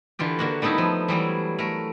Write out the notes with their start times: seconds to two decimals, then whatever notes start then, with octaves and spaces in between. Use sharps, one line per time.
0.19 D3 E3 F4 G4
0.39 D3 A#3 F#4
0.62 G3 A3 B3 D#4 E4
0.78 F3
1.08 E3 F#3 G3 E4
1.59 A3 A#4